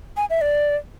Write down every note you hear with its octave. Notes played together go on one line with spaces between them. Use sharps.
G#5
E5
D5